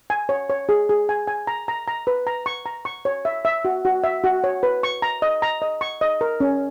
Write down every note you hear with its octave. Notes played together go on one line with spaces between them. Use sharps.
G#5
C#5
C#5
G#4
G#4
G#5
G#5
A#5
A#5
A#5
B4
A#5
C#6
A#5
C#6
C#5
E5
E5
F#4
F#4
E5
F#4
C#5
B4
C#6
A#5
D#5
A#5
D#5
C#6
D#5
A#4
C#4